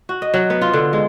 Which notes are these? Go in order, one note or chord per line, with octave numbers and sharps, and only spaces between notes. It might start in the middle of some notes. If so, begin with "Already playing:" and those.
F#4
D#5
F#3
B3
F4
D3
G#3